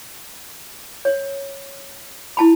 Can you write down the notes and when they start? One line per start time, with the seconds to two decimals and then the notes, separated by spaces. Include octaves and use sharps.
1.05 C#5
2.37 E4 A5 B5